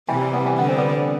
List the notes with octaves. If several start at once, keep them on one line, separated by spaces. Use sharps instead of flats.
C3 E3 G3
E3 G3
G3 B3
E3 G3
D3 B3
C4
G3 B3